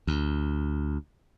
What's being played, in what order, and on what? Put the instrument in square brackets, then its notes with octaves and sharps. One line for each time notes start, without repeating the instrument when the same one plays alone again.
[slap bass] D2